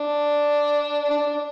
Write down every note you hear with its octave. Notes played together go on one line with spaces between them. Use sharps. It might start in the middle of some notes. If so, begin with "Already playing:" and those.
Already playing: D4
D4
D4